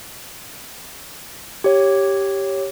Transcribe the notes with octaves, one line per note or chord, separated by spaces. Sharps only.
G4 C#5